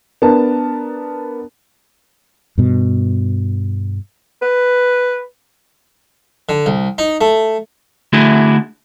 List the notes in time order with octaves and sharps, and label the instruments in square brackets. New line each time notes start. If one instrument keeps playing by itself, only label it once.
[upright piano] B3 D4 A#4 A5
[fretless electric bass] G2 B2
[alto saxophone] B4
[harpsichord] D3
C2
D#4
A3
[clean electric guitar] D3 A3 E4 F#4 G#4